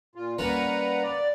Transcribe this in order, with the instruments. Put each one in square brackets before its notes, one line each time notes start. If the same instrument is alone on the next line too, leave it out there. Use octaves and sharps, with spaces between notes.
[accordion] A#2 F4
[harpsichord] G3 A#3 C#4 [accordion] B4 F#5 A#5
[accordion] D5